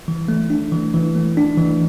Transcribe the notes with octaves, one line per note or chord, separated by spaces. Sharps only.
E3
A3
D4
E3
E3
A3
D4
E3